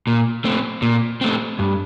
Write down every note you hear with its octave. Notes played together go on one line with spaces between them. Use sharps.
A#2
A3 C4
A#2
A3 C4
G2